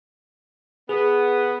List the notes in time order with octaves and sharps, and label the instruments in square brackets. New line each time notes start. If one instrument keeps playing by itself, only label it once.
[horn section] B3 [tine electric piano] G#4